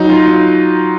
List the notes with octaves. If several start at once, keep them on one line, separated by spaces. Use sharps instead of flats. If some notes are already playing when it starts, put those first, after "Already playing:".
Already playing: F#3 D#4
F4
D#4